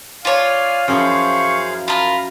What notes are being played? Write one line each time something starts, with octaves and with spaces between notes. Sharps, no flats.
F4 C#5 D5 F5 G#5
F#2 F3 E4 G#4 C5 F5 C#6
F4 A#4 B5